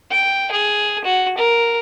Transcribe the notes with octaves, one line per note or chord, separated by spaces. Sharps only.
G5
G#4
F#4
A#4